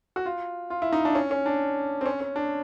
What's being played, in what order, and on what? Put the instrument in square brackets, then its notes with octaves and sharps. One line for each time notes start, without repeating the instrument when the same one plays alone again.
[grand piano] F#4
F4
F4
E4
D#4
D4
C#4
C#4
D4
C4
C#4
C#4
D4